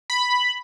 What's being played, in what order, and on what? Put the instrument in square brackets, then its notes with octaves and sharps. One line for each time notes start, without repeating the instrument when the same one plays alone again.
[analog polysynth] B5